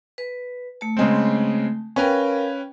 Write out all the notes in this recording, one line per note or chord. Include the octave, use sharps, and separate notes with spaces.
B4
A3 A5
C#3 G#3 C4
C#4 A#4 B4 F5 G5